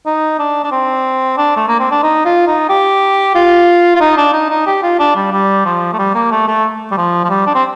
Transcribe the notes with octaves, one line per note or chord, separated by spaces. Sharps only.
D#4
D4
D4
C4
D4
A3
A#3
C4
D4
D#4
F4
D#4
G4
F4
F4
D#4
D4
D#4
D#4
G4
F4
D4
G3
G3
F3
A3
G3
A#3
A3
A3
G3
F3
F3
G3
D4
C4